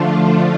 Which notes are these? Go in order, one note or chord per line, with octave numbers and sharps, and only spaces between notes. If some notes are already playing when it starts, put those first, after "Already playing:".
Already playing: D3 F3 A3 D4 F4